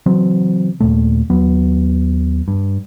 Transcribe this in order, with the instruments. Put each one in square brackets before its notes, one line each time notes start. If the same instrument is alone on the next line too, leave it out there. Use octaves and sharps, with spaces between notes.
[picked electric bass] C#3 E3 F#3 C4
D#2 A#2 A3
D#2 F#3 B3
G2